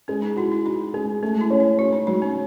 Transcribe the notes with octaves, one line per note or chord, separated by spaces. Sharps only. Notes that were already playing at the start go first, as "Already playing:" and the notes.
G#3 C#4
D#4
E4 F#4
E4
D#4 F#4
G#3 C#4
A3 C#4
E4
C#4
E4
C#4 F#4
D#4
F#3 D#4
C#4